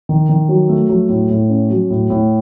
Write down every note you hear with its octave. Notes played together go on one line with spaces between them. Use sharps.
D#3
D#3
F#3
A3
F#3
A2
A2
C#4
F#3
A2
A2